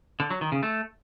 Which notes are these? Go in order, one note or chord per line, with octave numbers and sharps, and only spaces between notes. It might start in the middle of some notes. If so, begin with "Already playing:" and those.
D3
F#3
D#3
C#3
A3